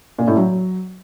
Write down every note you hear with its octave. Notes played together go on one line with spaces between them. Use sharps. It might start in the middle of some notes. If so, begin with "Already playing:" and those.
A#2
A2
F#3